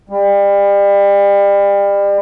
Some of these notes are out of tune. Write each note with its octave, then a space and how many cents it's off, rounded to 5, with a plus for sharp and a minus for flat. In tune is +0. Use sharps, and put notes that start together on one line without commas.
G3 +35